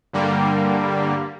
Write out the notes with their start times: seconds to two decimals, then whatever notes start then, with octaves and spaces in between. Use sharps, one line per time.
0.13 G2 D3 G3 A#3